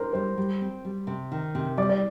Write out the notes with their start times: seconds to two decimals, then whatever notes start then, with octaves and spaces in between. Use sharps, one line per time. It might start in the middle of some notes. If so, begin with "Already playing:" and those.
Already playing: D4 A#4 C5
0.13 G3 C5
0.37 G3
0.61 C4
0.85 G3
1.07 C3
1.32 D#3
1.55 C3
1.77 G3 D5
1.89 D5